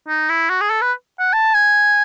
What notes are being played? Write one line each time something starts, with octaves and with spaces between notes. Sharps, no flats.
D#4
E4
F#4
G#4
A4
B4
F#5
A5
G#5